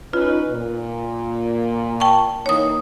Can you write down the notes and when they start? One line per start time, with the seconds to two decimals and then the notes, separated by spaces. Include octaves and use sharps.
0.13 C#4 D#4 F4 B4
0.51 A#2
2.00 G5 A5 C#6
2.46 E3 A#3 D#4 C#5 D#6